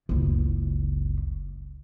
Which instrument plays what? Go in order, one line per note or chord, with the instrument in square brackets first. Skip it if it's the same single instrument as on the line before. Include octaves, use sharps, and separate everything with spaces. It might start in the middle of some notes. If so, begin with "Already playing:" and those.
[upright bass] F#1 C#2